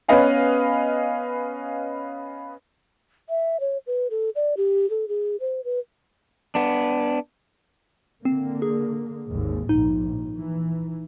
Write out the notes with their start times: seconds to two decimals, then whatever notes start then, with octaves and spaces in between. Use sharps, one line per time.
0.08 B3 C#4 B4 D#5 F5 G#5
3.29 E5
3.60 C#5
3.87 B4
4.10 A4
4.35 D5
4.57 G4
4.90 A4
5.08 G#4
5.40 C5
5.65 B4
6.55 B3 D4
8.25 D3 A#3 C4
8.62 G#4
9.28 G#1 D#2 G#2
9.69 A#1 D#2 D#4
10.38 E3